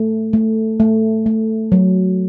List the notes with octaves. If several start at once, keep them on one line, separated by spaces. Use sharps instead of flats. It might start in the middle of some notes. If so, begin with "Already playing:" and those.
Already playing: A3
A3
A3
A3
F#3